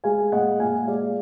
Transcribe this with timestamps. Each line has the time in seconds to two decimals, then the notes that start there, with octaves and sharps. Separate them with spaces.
0.04 G#3 F5 G#5
0.32 A#2 D#5 F#5
0.60 A#2 F5 G#5
0.88 G#3 D5 F5